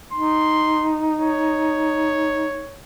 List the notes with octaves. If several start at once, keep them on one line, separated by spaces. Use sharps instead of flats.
D#4 C6
C#5